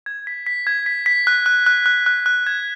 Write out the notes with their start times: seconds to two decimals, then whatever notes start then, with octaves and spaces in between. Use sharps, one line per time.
0.06 G#6
0.27 B6
0.47 B6
0.67 G#6
0.86 B6
1.06 B6
1.27 F#6
1.46 F#6
1.67 F#6
1.86 F#6
2.06 F#6
2.26 F#6
2.47 G#6